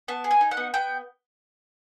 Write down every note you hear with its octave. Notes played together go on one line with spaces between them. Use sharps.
B3 A5
G#4
G#5
D#4
F#5
B3
B3 G5